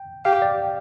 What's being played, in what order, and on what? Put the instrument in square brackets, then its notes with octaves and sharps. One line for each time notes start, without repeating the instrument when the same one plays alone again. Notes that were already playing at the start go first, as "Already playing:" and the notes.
Already playing: [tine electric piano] G5
[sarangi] G4 [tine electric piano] F5
[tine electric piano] D5